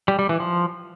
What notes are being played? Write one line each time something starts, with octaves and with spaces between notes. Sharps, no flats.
G3
G3
E3
F3